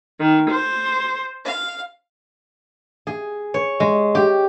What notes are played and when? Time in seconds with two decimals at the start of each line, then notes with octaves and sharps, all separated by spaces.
0.19 D#3
0.50 C5
1.44 F5
3.07 G#4
3.54 C#5
3.80 G#3
4.15 G4